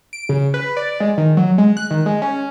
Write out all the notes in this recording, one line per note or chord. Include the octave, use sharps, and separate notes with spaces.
D7
C#3
B4
D5
G#3
D#3
F#3
G#3
F#6
D#3
G#3
C#4